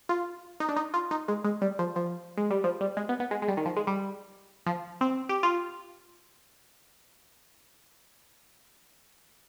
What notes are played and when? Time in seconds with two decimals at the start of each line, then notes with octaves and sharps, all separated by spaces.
0.09 F4
0.60 D#4
0.69 D4
0.76 D#4
0.94 F4
1.11 D#4
1.28 G#3
1.44 G#3
1.62 G3
1.79 F3
1.96 F3
2.37 G#3
2.50 G3
2.64 F3
2.81 G3
2.97 G#3
3.09 B3
3.20 B3
3.31 G#3
3.42 G#3
3.48 G3
3.57 D#3
3.66 F3
3.76 G#3
3.87 G3
4.66 F3
5.01 C4
5.29 G4
5.43 F4